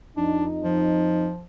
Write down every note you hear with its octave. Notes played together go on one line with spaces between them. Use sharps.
F2 D4 D#4
F3